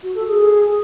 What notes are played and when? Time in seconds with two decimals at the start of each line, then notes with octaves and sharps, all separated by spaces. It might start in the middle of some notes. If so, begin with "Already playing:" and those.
0.03 F#4
0.15 A4
0.27 G#4